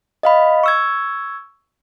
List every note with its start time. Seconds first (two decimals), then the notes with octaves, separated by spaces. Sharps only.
0.23 D#5 F5 B5
0.64 C#6 E6 G#6